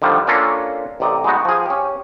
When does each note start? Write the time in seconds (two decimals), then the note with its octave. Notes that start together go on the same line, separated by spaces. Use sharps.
0.02 D3 D#3 F3 G3 F5
0.27 A#3 C#4 D4 F4 A4 A#4
1.00 A1 C3 D5 D#5 A#5
1.24 G#3 B3 D#4 F#4
1.45 F3 G#4
1.66 C#4 G4